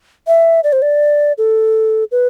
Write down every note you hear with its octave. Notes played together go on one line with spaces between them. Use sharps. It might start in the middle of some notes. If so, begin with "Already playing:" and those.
E5
D5
C5
D5
A4
B4